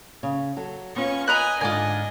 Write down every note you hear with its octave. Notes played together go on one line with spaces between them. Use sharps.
C#3 C#5
F#3 A4
B3 C#4 F4 C#6
D#5 G#5 A#5 B5 F#6
G#2 D3 D4 F4 D#5 G#5